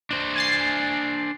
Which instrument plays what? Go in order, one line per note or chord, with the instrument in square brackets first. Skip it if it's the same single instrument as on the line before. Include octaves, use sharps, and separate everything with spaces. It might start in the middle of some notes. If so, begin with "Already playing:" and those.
[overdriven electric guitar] D4 C5
[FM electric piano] G#5 A6 C7